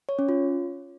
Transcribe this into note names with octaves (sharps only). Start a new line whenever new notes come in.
C#5
C#4
F4